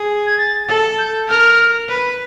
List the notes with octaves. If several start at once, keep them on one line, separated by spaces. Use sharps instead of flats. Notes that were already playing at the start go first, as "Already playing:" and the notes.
Already playing: G#4
G#6
A6
A4
G6
A#4 F6
B4